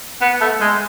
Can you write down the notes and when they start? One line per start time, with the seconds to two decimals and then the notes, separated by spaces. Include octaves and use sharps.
0.21 B3
0.41 A3
0.61 G#3